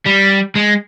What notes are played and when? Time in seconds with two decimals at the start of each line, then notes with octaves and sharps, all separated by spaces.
0.06 G3
0.56 G#3